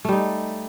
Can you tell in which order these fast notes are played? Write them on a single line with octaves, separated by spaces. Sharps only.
A3 G3 D#4